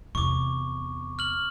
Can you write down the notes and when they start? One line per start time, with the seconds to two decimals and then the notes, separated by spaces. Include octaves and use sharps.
0.15 E2 C3 C#6 D6
1.19 F6 F#7